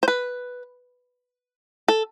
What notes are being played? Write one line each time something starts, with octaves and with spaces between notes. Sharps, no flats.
C5
B4
A4